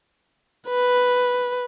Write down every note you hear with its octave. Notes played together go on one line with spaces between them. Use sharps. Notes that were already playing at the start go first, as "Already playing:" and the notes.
B4